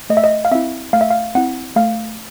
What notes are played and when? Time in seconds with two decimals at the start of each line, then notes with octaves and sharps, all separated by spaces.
0.10 A3 D#5
0.17 E5
0.24 D#5
0.45 F5
0.51 C4 E4 E5
0.93 A3 F5
1.01 E5
1.10 F5
1.35 C4 E4 F#5
1.76 A3 F5